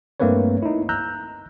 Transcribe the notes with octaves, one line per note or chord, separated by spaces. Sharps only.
G2 A3 A#3 C4 B4 C#5
D#4 E4
A#5 E6 F#6 G6